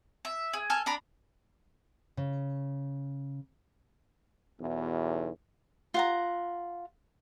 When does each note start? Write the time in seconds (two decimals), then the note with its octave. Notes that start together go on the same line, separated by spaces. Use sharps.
0.25 E5
0.53 G#4
0.70 A4 G#5 F6
0.86 D4 A#5 B5
2.17 C#3
4.61 B1 E2
5.94 F4 F#5 A#5